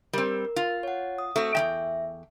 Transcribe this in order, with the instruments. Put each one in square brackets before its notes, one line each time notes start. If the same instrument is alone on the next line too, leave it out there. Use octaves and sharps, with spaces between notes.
[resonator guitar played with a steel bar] G3 C4 [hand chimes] A#4
[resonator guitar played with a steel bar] F4
[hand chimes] C#5 F#5
D#6
[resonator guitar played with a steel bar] A3 C4 F#4
[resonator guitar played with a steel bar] E2 G#3 G5 [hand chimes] E5